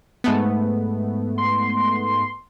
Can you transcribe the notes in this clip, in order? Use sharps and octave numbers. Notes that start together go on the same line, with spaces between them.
G#2 A3 B3
C6